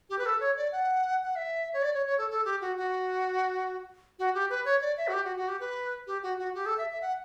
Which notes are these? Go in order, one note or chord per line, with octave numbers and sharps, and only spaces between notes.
G4
B4
A4
C#5
D5
F#5
F#5
E5
C#5
D5
C#5
C#5
A4
A4
G4
F#4
F#4
F#4
G4
B4
C#5
D5
E5
F#4
G4
F#4
F#4
G4
B4
G4
F#4
F#4
G4
A4
E5
E5
F#5